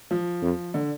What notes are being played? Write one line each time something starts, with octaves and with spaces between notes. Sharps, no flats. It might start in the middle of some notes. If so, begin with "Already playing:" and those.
F3
F2
D3